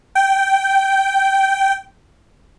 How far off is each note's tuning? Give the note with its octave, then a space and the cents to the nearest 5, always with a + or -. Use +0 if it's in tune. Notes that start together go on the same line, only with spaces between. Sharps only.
G5 -10